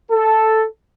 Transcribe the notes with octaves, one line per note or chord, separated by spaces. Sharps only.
A4